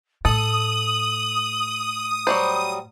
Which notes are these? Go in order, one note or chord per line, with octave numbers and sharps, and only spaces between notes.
A2 A4 D#6 F#7
F#3 G3 C5